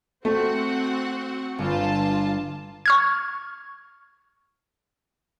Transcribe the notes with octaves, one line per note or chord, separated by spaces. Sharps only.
A3 C4 F#4 F#5
G1 F4 A5
C#6 F6 G#6